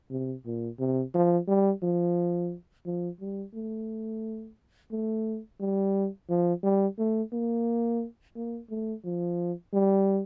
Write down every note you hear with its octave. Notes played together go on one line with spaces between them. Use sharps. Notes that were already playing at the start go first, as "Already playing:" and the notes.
C3
A#2
C3
F3
G3
F3
F3
G3
A3
A3
G3
F3
G3
A3
A#3
A#3
A3
F3
G3